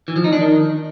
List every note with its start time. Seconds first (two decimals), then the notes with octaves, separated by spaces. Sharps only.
0.08 E3
0.16 F3
0.24 D#4
0.32 D4
0.41 D#3